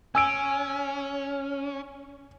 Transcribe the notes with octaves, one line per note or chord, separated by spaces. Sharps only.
C#4 G#5 E6 D7